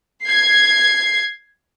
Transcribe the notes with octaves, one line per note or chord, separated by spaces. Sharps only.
G#6 C7